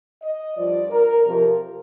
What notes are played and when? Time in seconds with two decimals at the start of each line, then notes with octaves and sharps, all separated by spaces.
0.22 D#5
0.56 G2 F3 D5
0.90 A#4
1.25 F2 C3 F3 A#4